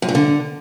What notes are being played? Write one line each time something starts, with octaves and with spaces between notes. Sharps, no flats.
F#2
G2
D3